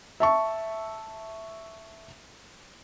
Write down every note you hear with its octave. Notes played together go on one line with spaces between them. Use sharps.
E5 A5 C#6